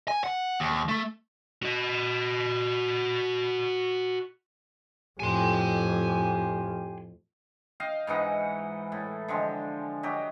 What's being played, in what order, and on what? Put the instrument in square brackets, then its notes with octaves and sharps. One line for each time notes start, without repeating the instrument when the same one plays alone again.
[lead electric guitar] G#5
F#5
D#2
A3
F#4 D#5
[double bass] F2 A2 [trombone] G4 [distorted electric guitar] G#5 C6
[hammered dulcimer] D#5 F5 G5
G#2 E3 D#4 F#5
A2
D3 F3 G#3 G4
F#3 G4 D#5